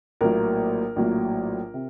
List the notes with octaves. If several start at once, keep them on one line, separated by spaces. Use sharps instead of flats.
A#1 A2 F#3 A#3 A#4
A#1 A2 F#3 A#3
C3